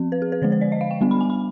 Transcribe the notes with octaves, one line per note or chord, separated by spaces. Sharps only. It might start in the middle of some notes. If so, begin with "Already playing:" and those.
Already playing: F3 C4
B4
G#4
B4
D3 F3 G#3 C5
C5
D5
D#5
F5
G5
G3 B3 D4
B5
G#5
B5